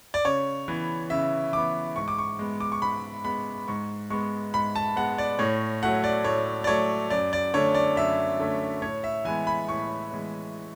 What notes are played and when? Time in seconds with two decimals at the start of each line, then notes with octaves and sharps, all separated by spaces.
0.14 D5
0.25 C#3 C#5
0.68 E3 B3
1.10 C#3 E5
1.53 E3 B3 D6
1.96 G#2 C#6
2.08 D6
2.18 C#6
2.39 G#3 B3
2.60 D6
2.72 C#6
2.82 G#2 B5
3.25 G#3 B3 B5
3.68 G#2 C#6
4.10 G#3 B3 C#6
4.54 G#2 B5
4.76 A5
4.96 G#3 B3 F#5
5.18 D5
5.39 A2 C#5
5.83 F#3 A3 F#5
6.04 D5
6.24 A2 C#5
6.64 D5
6.67 F#3 A3 C#5
7.10 F#2 D5
7.33 D5
7.54 D3 A3 C#4 C#5
7.75 D5
7.96 F#2 E5
8.39 D3 A3 C#4
8.82 A2 C#5
9.04 E5
9.25 E3 G#3 B3 G#5
9.47 B5
9.68 A2 C#6
10.11 E3 G#3 B3